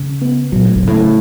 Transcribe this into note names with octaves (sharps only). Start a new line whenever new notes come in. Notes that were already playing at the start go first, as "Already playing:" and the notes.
Already playing: C#3
B3
A#2 F#3
A2
G#2
A2 C#3